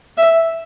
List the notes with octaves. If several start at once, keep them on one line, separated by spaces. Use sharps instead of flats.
E5